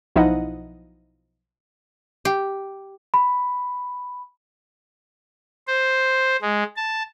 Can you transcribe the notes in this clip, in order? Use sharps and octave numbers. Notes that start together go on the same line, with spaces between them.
B1 F3 D#4 E4 D#5 F#5
G4
B5
C5
G#3
A5